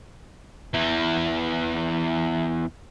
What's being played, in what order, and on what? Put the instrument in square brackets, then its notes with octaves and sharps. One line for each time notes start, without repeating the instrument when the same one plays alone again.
[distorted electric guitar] E2 E3